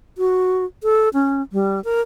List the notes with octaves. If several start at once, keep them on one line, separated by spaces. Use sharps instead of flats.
F#4
A4
C#4
G3
A#4